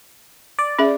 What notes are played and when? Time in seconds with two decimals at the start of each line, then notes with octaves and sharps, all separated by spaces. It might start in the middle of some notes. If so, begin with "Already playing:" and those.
0.59 D5
0.79 C#4 G#4 E5